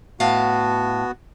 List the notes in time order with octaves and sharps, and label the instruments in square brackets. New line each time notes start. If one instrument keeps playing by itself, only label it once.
[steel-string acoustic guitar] A2 F5 A5 [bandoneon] B3 F#4